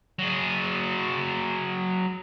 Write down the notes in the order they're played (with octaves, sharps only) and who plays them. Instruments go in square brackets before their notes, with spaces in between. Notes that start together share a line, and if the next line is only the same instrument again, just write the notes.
[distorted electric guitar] F#3 G#4